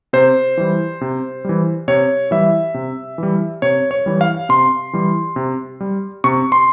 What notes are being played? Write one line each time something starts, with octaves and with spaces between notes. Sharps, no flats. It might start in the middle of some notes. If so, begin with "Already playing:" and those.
C3 C5
E3 G3
C3
E3 G3
C3 C#5
E3 G3 E5
C3
E3 G3
C3 C#5
C#5
E3 G3
F5
C3 C6
E3 G3
C3
G3
C3 C#6
C6